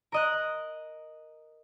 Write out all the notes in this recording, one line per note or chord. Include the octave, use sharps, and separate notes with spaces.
A#4 D#5 F#6